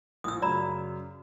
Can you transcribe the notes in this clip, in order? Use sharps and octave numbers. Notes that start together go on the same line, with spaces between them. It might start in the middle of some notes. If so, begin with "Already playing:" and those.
A#1 A2 D#6 E6
F#2 C#3 D5 A#5 B5